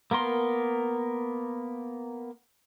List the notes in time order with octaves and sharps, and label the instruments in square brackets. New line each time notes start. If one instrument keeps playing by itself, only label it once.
[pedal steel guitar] A#3 B3 A#4 C6